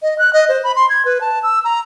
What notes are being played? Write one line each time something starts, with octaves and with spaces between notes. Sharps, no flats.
D#5
F#6
D#5
C5
B5
C6
G#6
B4
A5
E6
A#5